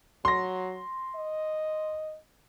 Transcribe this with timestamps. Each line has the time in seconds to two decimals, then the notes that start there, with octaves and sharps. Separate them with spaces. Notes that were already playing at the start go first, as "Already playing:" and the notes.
0.25 F#3 C6 A#6
1.16 D#5